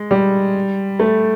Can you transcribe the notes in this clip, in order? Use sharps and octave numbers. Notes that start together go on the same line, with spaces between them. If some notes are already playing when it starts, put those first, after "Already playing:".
Already playing: G#3
G3
A3